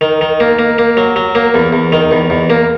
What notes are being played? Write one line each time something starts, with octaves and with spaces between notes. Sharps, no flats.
D#3
D#3
A#3
A#3
A#3
F#3
F#3
A#3
E2
E2
D#3
E2
E2
A#3